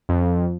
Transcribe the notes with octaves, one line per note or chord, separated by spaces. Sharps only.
F2